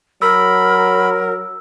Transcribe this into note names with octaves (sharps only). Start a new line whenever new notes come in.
F#3 A#4 B5 E6